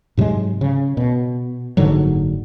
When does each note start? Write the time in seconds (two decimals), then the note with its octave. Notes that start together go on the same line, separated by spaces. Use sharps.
0.17 G#2 C3 F#3 G#3
0.61 C#3
0.97 B2
1.77 F#1 G#2 D3 F#3